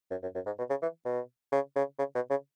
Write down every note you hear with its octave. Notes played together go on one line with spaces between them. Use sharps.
F#2
F#2
F#2
G#2
B2
C#3
E3
B2
C#3
C#3
C#3
B2
C#3